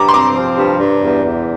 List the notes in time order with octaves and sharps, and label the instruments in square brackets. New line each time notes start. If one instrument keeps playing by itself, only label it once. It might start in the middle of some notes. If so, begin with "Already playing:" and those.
Already playing: [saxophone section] G2 [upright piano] A#5 D6
[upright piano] C6
[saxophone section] C4 [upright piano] A#5 D6
[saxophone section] F3
G2
G2
E2
E2